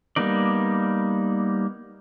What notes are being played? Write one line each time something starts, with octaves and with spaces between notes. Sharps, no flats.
G3 A#3 B3 D#4 D5